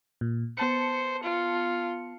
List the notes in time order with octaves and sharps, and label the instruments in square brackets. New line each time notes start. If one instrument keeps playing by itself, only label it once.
[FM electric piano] A#2
[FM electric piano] B3 A5 C#7 [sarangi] C5
[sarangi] F4